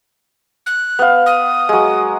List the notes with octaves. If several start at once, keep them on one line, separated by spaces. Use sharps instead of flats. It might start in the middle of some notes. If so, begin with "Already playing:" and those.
F#6
B3 F5
D#6
F#3 G#3